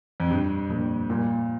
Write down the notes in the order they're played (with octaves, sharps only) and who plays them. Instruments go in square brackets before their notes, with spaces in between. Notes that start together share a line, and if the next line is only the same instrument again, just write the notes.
[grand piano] F2
[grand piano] G2 [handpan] A#2 F3 A#3
[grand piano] G2 [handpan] A#2 F3 A#3
[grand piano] A#2 [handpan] G3 A#3 F4 A#4